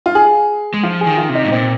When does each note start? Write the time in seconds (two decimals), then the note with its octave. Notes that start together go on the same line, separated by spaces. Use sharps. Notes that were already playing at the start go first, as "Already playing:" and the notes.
0.06 F4
0.15 G#4
0.74 G#3
0.83 F3 F4
1.01 G#4
1.06 D#3
1.17 F4
1.29 C3
1.35 D#4
1.45 G#2
1.52 A#2 C4